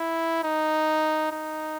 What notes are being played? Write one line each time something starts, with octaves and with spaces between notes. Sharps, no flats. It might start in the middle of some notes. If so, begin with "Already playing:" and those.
Already playing: E4
D#4
D#4